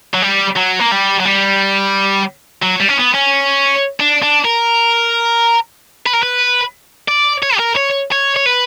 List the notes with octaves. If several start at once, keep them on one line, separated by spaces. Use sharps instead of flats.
F#3
G3
F#3
A#3
G3
F#3
G3
F#3
G3
C#4
B3
C#4
D4
D4
A#4
B4
A#4
B4
D5
C#5
G4
A#4
C#5
C#5
C#5
B4